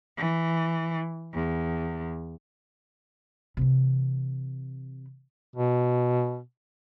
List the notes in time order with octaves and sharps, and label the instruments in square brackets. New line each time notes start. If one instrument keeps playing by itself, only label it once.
[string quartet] E3
E2
[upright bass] C3 E3
[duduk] B2